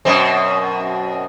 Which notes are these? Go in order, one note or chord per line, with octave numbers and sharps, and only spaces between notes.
F#2 B2 C4